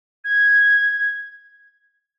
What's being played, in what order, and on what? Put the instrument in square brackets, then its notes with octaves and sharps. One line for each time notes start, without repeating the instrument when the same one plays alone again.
[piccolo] G#6